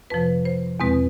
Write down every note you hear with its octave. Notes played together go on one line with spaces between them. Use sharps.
F2 C3 F3 B4
C5
E2 B2 G#3 C4 B4